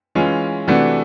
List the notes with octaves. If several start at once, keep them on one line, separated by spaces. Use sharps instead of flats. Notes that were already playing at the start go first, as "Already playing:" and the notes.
E3 G#3 C#4 F4
C3 E3 A3 D4 F#4